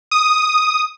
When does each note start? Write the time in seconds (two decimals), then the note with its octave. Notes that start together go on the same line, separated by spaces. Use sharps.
0.11 D#6